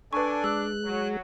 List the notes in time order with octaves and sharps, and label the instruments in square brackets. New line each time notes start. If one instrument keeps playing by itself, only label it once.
[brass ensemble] D4 [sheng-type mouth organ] A4 G#5 [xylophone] B4 C#6
[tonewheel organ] G#3 [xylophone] E6 [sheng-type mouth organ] F#6
[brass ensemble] F#3